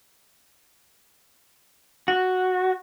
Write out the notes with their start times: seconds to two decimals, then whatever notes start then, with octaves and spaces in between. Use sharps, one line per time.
2.08 F#4